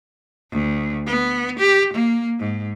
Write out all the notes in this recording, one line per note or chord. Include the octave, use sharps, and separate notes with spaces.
D2
B3
G4
A#3
G#2